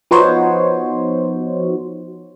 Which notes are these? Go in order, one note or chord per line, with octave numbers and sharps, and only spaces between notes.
F3 B3 D#4 F#4 C5 C#5